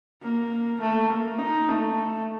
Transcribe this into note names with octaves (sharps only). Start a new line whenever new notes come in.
A#3
A3
A#3
D#4
A3